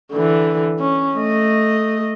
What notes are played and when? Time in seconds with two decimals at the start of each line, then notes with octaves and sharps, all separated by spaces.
0.12 D3 E3
0.80 C#4
1.16 A3 D#5